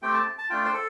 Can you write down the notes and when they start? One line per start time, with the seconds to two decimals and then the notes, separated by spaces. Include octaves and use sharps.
0.02 A3 C4 G4 G5
0.14 A5
0.38 A5
0.50 A3 D4 F4 G5
0.65 C5
0.74 A4